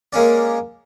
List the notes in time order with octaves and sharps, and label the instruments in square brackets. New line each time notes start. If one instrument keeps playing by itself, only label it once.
[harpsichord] G#3 A#3 C#4 D5